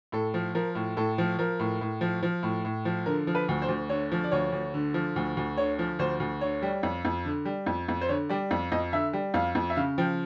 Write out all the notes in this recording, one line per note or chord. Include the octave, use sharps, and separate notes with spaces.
A2 A4
F3
F3 A#4
A2
A2 A4
F3
F3 A#4
A2
A2
F3
F3
A2
A2
F3
D3 A#4
F3
B4
D2
C5
D2
D3 C#5
F3
D5
D2 C#5
D2
D3
F3
D2
D2
D3 C#5
F3
D2 C5
D2
D3 C#5
G3
F2
F2
D3
G3
F2
F2
C5
D3 C#5
G3 D5
F2
F2 D#5
D3 E5
G3
F2 F5
F2
E5
C#3 F5
F3 G5